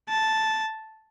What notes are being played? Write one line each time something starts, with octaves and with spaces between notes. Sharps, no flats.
A5